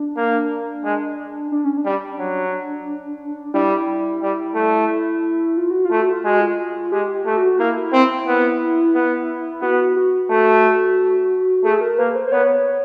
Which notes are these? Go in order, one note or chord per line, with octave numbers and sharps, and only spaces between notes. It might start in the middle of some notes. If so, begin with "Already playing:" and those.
Already playing: D4
A#3
G#3
D4
C#4
D4
G3
F#3
G3 E4
G3
A3
F4
F#4
F4
A3
F#4
F4
G#3 F#4
F4
G#3 G4
G4
A3
F#4
A#3 E4
C4
B3
B3
B3 F#4
F#4
A3
A3 G#4
A#4
A#3 B4
C5
C5
B3 C#5